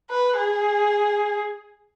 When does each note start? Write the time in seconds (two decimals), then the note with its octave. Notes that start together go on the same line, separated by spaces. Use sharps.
0.10 B4
0.38 G#4